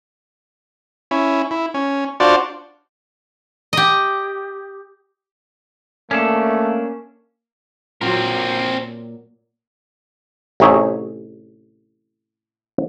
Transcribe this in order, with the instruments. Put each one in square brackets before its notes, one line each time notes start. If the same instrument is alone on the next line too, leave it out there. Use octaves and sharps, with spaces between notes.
[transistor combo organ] C#4 E4
E4
C#4
D4 F4 F#4 C5 D5
[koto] G4 D#5
[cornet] A3 [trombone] A#3 [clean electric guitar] C#4 D4 A4
[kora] A#2 F#3 [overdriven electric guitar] C4 A#4
[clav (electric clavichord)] A1 C3 D#4 G#4 C#5 E5